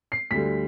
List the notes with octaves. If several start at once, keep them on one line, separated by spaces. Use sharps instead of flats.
C7
D2 D3 G3 B6